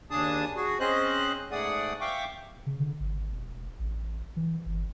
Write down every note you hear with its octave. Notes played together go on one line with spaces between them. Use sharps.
D#2 C#3 D4 G#4 A5 D#6
F#4 G#4
C4 C#4 G#4 C5 D#5 F#6
G#2 A3 G#4 D5 F#5 D#6
E5 F5 G5 C#6 D6
C#3
D3
G#1
E1
A1
E3
G1